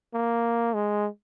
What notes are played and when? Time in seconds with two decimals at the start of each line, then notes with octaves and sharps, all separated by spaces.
0.14 A#3
0.75 G#3